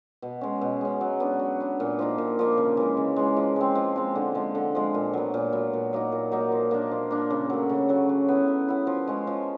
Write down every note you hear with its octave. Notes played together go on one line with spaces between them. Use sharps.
B2
G#3 C#4
B2
G#3 C#4
F#3
B3 D4
F#3
B3 D4
A#2
F3 A#3 D#4
A#2
F3 A#3 D#4
C#3
E3 G#3
C#3
E3 G#3
F3
G#3 C4
F3
G#3 C4
D3
F3 G#3
D3
F3 G#3
A#2
F#3 B3
A#2
F#3 B3
A#2
F#3 A#3 D#4
A#2
F#3 A#3 D#4
F3
A#3 D4
F3
A#3 D4
C#3
F#3 A3
C#3
F#3 A3
F#3
B3 E4
F#3
B3 E4
F3
G#3 C#4
F3